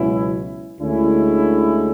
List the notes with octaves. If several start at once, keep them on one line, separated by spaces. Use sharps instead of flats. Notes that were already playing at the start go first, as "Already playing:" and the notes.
Already playing: C#2 B2 F#3 C#4 E4
D2 D3 G#3 C#4 E4